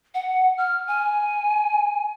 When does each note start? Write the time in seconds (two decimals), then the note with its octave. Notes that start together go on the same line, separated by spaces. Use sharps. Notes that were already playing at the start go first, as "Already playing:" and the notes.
0.14 F#5
0.58 F6
0.88 G#5